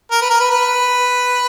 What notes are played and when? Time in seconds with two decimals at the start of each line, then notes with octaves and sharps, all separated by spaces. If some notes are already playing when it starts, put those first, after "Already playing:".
0.11 A#4
0.21 B4
0.30 A#4
0.40 B4
0.51 B4